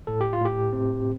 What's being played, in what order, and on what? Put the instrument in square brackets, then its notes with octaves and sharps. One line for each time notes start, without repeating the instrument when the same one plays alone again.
[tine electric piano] A2 A4
G4
F4
A2 G4
C4